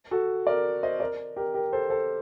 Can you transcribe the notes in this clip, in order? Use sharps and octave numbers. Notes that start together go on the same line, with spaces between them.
F#4 A4
A#4 D5
C5 D#5
A#4 D5
G4 A#4
G4 A#4
A4 C5
A4 C5